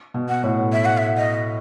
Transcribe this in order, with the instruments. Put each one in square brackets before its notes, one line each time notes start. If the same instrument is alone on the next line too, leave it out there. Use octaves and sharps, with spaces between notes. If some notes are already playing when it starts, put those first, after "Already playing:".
[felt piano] B2
[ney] F#5
[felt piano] A2
[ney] E5
F#5
E5
D#5